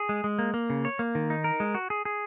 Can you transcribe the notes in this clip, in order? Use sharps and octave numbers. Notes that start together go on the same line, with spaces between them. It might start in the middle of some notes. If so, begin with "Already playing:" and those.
Already playing: G#4
G#3
G#3
A#3
A#3
C#3
C#5
A#3
D#3
D#4
A#4
G#3
F#4
G#4
G#4